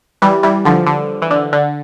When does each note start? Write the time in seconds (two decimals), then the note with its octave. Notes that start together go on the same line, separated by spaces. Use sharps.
0.22 E3 G3
0.43 E3 G3
0.65 D3 F3
0.86 D3
1.22 E3
1.31 D3
1.53 D3